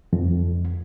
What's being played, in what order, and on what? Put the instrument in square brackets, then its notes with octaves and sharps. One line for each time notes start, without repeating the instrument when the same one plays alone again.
[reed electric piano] F2